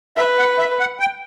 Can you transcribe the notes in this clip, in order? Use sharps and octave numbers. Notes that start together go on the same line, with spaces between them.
B4 E5
F#5
E5
F#5
G5